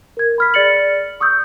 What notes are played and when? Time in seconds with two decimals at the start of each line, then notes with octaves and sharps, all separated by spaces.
0.17 A#4 G#6
0.38 B5 F6 B6
0.54 G#4 D5 A6 C#7 F#7
1.20 C#6 D#6 E6 G6